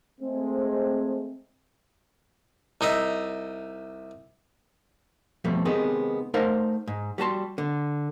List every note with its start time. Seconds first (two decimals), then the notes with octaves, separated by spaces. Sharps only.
0.21 G#3 A3 C4
2.81 C2 D#4 D#5 E5
5.44 F2 B2 G3 A3
5.65 C3 D#3 G#3 B3
6.34 A3 D#4 A#4 C5 F5 F#5
6.87 G#2
7.18 G3 F#4 A5 C6
7.58 D3